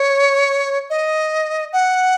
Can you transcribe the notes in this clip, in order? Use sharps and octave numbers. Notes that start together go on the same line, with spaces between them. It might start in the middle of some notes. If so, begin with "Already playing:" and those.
Already playing: C#5
D#5
F#5